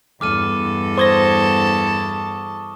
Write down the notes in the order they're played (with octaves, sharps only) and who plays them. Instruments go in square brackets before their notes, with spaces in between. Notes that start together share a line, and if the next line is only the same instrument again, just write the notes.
[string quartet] E2 G2 A4 [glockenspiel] D6 F6 D#7
[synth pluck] C5 G#6 A#6 [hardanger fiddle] A5 [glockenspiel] C#6 D#6 G7